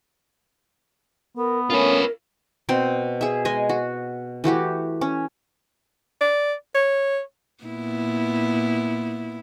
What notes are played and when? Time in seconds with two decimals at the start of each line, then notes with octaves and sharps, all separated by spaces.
1.37 B3 A#4
1.70 A3 C#4 F4 A#4 B4 C#5
2.69 B2 C4 G5 C6
3.21 G#4 E5
3.45 G#3 D#5 G#5
3.69 F#4
4.44 E3 A3 F#4 G4
5.01 C#4
6.21 D5
6.75 C#5
7.64 A#2 B3 E4